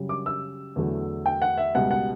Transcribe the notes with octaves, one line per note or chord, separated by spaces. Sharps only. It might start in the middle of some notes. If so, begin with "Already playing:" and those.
Already playing: F#2 C#3 G3
D6
E6
E2 D3 F#3 A3
G5
F#5
E5
C#2 B2 G3 F#5
F#5